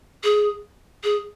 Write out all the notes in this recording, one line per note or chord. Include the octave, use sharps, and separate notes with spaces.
G#4
G#4